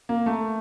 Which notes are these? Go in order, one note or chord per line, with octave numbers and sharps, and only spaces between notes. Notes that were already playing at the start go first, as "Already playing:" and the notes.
A#3
A3